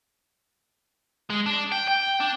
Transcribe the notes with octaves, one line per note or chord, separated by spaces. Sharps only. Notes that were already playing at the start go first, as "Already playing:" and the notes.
G#3
D4
G5
G5
D4